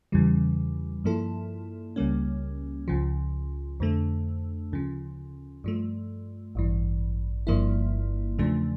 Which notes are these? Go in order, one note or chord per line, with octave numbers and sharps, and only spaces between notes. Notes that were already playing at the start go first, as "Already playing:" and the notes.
E2 C#3 E3 G3
G2 F3 A#3 E4 A4
C#2 C#3 G3 A#3 C#4
C#2 C#3 F3
F2 D3 A3
D2 C#3 F3
G2 F3 A3
A1 G2 E3
G1 G2 F3 A#3 E4
E2 C#3 F3 A3 D4